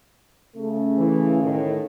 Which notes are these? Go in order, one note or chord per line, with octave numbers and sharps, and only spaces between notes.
C#3 A3
E3
A2 D#3